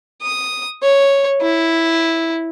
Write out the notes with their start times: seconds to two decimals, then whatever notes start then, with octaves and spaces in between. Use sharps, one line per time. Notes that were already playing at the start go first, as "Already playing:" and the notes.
0.22 D#6
0.83 C#5
1.42 E4